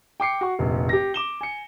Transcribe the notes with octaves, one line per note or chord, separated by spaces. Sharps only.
G5 D6 C7 C#7
F#4 C#6
F1 A#1
G4 A#6
D6 E7 G7
G#5 C#7